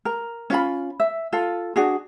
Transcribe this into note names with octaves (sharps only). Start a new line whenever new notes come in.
A#4
C#4 F4 B5
E5
F4 A4
D4 F#4 G#4